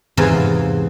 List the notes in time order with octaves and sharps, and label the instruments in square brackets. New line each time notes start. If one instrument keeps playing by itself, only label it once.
[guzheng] E2 G#2 C3 E3 F5